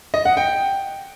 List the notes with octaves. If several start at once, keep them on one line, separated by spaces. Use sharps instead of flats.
D#5
F#5
G5